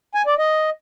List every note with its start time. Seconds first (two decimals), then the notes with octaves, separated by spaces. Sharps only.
0.15 G#5
0.27 D5
0.39 D#5